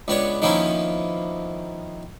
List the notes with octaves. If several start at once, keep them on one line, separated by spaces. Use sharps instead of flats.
C#2 B3 D4 C#5
D#3 F3 A#3 B3 C#4 E4